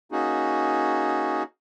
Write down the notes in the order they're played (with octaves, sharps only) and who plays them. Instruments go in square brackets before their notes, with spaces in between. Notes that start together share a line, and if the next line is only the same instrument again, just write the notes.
[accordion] A#3 C#4 D#4 F#4 G#4